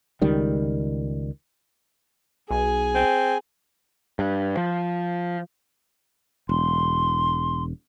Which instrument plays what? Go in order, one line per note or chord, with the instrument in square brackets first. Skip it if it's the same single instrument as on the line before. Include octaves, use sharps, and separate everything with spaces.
[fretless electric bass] C#2 D#3 G3
[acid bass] B1 [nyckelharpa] G#4 [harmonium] G#5
[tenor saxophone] C4
[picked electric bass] G2
F3
[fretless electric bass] E1 [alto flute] C6